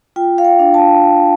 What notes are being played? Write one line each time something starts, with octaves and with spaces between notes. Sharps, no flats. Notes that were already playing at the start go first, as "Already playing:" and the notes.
F4 G5
F5
G5
D4
A5